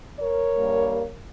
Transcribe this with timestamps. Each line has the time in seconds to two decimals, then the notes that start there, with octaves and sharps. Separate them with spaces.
0.20 A#4 C#5
0.56 G2 G3 A#3